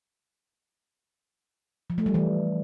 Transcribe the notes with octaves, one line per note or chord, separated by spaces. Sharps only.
F3
A3
G3
E3